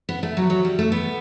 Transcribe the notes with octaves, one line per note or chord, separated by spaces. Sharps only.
B3
A3
F#3
F#3
G3
A3
B3